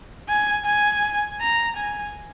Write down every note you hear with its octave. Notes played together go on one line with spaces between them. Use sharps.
G#5
G#5
A#5
G#5